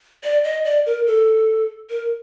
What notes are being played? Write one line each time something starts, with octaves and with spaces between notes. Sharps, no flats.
D5
D#5
D5
A#4
A4
A#4